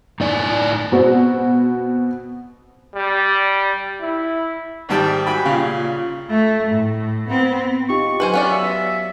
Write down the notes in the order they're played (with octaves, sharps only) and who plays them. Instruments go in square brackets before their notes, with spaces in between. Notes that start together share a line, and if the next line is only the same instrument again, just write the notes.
[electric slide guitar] A2 D#4 D5 G#5
[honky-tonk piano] B2 C4 F#4
[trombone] G3
E4
[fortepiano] G#2 D#3 G3 G5 A5
F#4 G5 G#5 B5
A#2 C#3
[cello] A3
A2
B3 C4
[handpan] D#4 F4 G4 [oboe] C#6
[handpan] F#3 G4 [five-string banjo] B4 C5 G#5
[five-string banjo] B3 C#4 D5 [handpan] F5
[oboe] E5